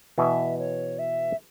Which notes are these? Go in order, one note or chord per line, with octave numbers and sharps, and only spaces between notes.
B2 E3 E5
C#5
E5